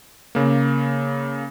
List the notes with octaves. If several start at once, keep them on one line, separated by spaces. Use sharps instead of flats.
C#3 A#3